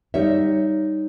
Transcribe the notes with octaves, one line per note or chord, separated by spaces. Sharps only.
G3 D#4 C#5 E5